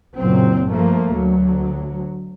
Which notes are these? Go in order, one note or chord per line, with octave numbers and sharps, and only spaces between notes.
F#1 A#2 F#3 C4
G2 F3 A3 A#3
D2 F#3